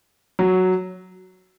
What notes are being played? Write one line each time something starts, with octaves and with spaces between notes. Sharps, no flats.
F#3